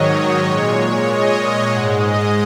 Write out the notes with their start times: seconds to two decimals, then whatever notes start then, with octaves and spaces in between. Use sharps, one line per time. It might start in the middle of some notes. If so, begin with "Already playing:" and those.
Already playing: G#2 D#3 F#3 C#5 D#5
0.18 D#5
0.48 A#2 G#3 C#5
1.09 D#5
1.39 D#5
1.69 G#2 G#3 F#5
1.99 D#5